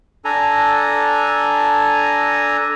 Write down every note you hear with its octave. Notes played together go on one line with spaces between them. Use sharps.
D4 A4 G#5 A#5